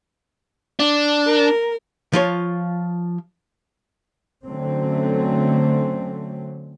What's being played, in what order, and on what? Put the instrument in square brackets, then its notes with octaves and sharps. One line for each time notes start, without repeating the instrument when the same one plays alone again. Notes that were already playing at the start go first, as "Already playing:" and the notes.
[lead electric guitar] D4
[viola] A#4
[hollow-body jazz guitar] F3 F4 C#5
[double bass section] D3 F#3 A3 C4 C#4